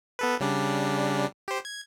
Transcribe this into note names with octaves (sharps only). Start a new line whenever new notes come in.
B3 A4 B4
C#3 G3 D4
G4 C5
G#6